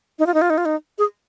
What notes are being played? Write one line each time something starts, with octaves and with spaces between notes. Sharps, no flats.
D#4
F4
D#4
F4
D#4
F4
D#4
G#4